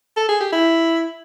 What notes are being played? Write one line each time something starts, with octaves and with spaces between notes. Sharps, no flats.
A4
G#4
G4
E4